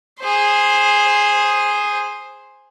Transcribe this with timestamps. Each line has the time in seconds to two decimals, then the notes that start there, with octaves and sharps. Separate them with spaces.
0.21 G#4 C5